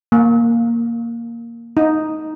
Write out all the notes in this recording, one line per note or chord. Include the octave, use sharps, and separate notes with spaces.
A#3
D#4